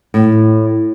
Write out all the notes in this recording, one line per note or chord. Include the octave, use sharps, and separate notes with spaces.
A2